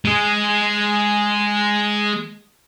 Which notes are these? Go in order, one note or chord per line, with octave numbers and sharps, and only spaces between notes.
G#3 G#4